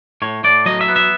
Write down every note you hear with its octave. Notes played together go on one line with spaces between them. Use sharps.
A2 C#5
A2 D5
F#3 D#5
E5
B3
E5